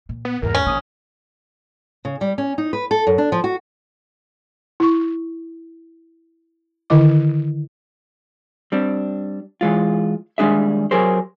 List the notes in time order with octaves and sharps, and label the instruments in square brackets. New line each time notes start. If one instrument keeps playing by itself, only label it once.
[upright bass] A#2
[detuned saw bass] B3
[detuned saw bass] E2 [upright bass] G#2 D#3 [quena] A#4
[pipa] C#4
[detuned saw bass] A#1 [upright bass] D#3 [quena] D#6
[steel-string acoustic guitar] C#3
G3
C#4
D#4
B4
A4
F#2
D4
F3
F#4
[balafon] E4 C#6
D3 D#3 E4 D#5 D6
[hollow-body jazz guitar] G3 C4 D4
E3 G#3 F4
D#2 G3 G#3 D4 G#4 E5
F#3 G4 G#4 A#4 C5